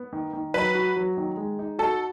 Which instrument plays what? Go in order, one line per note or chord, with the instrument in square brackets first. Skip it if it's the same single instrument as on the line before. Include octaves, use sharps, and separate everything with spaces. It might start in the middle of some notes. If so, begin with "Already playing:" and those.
Already playing: [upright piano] B3
D#3
D#3
[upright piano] F#3 [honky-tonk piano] B4
[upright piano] F#4
F#3
D#3
G#3
D#4
[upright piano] F#4 [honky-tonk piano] A4